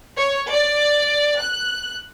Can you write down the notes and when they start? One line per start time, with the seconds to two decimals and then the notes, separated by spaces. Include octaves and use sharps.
0.16 C#5
0.51 D5
1.39 F#6